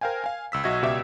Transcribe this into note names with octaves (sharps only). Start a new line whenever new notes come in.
A#4 C5 F5 G5 G#5
F5 G#5
C#2 E6 B6
B1 F#4 D#5 E5 G#6
C#2 B2 G4 D5 E5